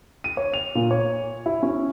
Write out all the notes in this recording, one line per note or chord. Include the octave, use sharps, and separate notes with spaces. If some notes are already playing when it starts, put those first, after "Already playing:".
D#7
C#5
F7
A#2
C#5
E4
C#4